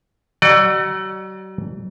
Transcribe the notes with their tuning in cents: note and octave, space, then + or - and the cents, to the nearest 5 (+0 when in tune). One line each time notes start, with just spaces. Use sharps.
F#3 +45 D5 +40 F#5 +15